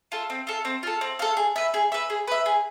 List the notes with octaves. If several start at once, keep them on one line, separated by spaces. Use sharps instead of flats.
F4 A4
C4
F4 A4
C4
F4 A4
C4
F4 A4
G#4
B4 E5
G#4
B4 E5
G#4
B4 E5
G#4